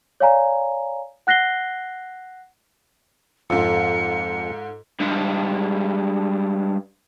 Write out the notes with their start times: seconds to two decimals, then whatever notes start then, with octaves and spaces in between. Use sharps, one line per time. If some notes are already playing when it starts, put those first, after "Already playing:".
0.20 C#5 D5 F5 G#5 A#5
1.27 F#5 F#6 A#6 C7 G7
3.50 F2 G#2 F4 A4 E6 C#7
5.00 G2 G#3